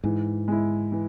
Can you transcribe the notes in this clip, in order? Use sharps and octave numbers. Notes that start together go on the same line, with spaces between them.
G#2 E3
G#3 E4
E3